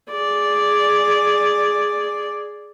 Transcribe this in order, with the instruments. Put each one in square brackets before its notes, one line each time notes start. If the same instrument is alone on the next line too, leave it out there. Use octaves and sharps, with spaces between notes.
[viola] G#4 D5